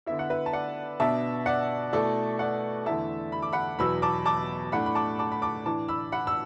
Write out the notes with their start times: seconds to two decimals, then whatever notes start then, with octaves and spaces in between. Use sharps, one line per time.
0.06 D3 B3 E4 E5
0.19 F#5
0.30 B4 E5
0.46 A5
0.53 D5 F#5
1.00 B2 B3 D4 E5 A5
1.46 D5 F#5
1.93 B2 A3 E4 A4 D5
2.39 D5 F#5
2.86 E2 D3 A3 E4 E5 A5
3.32 B5
3.42 D6
3.53 F#5 B5
3.79 E2 B2 F#3 B3 B5 E6
4.02 A5 D6
4.26 A5 D6
4.72 A2 A3 D4 F#5 B5
4.86 B5
4.95 A5 D6
5.19 A5 D6
5.32 B5
5.42 A5 D6
5.66 A2 E3 D4 A5 D6
5.88 B5 E6
6.12 F#5 B5
6.27 E6